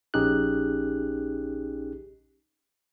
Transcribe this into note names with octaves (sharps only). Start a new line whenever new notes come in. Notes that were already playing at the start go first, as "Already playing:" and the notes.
A#1 C#4 D#4 G4 G#4 F#6